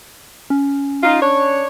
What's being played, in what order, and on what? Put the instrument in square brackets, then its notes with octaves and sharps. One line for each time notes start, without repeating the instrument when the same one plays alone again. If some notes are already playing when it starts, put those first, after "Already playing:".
[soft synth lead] C#4
[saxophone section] D#4 F4
D4 C#5